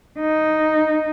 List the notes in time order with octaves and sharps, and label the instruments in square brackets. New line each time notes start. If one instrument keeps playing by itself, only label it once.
[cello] D#4